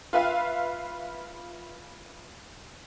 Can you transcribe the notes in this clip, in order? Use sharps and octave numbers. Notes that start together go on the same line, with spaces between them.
F4 B4 E5 F5